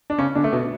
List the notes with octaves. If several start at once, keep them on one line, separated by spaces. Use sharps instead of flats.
D4
C#3 C#4
D3 D4
A3
B2 B3